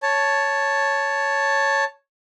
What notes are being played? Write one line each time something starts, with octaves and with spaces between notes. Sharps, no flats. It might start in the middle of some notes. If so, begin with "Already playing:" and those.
C#5 A5